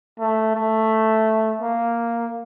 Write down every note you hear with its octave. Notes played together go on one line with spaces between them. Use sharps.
A3
A3
A#3